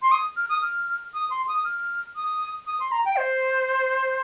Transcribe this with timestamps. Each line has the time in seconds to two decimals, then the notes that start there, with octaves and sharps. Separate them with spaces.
0.02 C6
0.11 D#6
0.37 F6
0.49 D#6
0.62 F6
1.14 D#6
1.30 C6
1.48 D#6
1.65 F6
2.16 D#6
2.67 D#6
2.80 C6
2.92 A#5
3.05 G5
3.18 C5